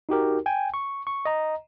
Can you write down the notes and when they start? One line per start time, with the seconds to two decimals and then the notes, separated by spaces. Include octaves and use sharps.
0.09 D#4 F#4 G4 A#4
0.46 G5 G#5
0.74 C#6
1.07 C#6
1.25 D#5 A#5